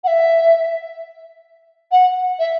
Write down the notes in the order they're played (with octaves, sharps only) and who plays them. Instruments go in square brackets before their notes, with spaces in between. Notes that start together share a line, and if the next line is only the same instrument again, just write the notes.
[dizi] F#5
E5
F#5
E5